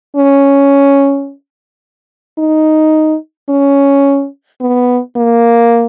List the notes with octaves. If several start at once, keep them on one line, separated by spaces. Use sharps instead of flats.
C#4
D#4
C#4
B3
A#3